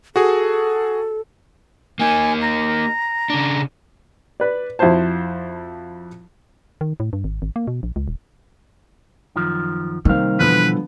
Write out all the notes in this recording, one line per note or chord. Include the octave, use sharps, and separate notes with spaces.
F#4 G#4 A4
A#3 D#4 G#5
A#5
C#3 D4
B4 D5
F2 E4 F#4 C5 A5
D#3
A2
G2
G#1
G#1
A#3
B2
A#1
C#2
D#1
F#2 D#3 F3
C2 D#3 G3 A#3 C4 F5
B2 D3 E3 F3 B3 B4